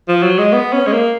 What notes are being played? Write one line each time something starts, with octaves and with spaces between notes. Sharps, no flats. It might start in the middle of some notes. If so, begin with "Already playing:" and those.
F3
F#3
G#3
B3
C#4
G#3
A#3